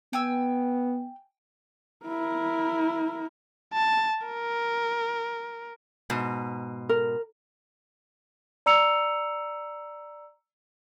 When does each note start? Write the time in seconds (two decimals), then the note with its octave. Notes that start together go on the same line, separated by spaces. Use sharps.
0.13 B3 G5 G#5 E6
2.06 E4 A#4
3.73 A5
4.27 A#4
6.10 G#2 B2
6.89 A#4
8.66 D5 A#5 E6 C#7 F7